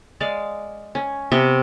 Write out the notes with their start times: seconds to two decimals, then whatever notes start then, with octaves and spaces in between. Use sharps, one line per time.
0.20 G#3 D5 F5
0.95 C#4
1.32 C3 B3 G5 C#6